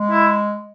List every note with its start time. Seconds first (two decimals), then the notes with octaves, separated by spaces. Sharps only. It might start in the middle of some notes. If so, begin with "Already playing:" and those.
Already playing: G#3
0.10 E4